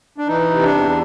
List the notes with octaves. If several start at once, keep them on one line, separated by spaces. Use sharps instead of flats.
D4
E3 D#4
C3
D4
E2